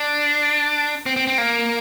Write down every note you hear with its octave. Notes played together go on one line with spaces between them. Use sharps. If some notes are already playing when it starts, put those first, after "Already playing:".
Already playing: D4
C4
C4
C4
A#3